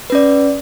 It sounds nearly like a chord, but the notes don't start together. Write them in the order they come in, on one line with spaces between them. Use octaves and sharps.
B4 C#4 D5